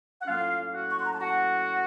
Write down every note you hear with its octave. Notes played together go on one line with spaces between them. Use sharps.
F#5
A2 F#3 A#3 C#4 F4 F5
F#4 F#5
C#6
C6
A#5
A5
F#4 F#5